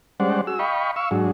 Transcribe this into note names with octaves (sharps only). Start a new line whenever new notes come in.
G3 G#3 C#4 C5 D5 F#5
F#4 G#4 E6
D#5 F5 G5 B5 C#6
F5 C#6 E6
G#2 F#3 D4 F#4 G#4